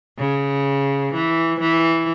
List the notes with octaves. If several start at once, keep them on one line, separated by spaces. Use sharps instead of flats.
C#3
E3
E3